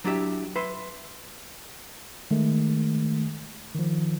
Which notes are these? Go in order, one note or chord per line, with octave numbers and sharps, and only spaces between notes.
F#3 D4 E4 G4 E5
B4 E5 C6
D#3 G#3 A3
D#3 F3